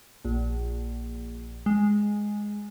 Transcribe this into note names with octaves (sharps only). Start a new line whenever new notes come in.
A#1
G#3